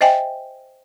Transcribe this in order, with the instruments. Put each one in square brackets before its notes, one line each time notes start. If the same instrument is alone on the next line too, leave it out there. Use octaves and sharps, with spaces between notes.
[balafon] C5 D#5 E5 G5 G#5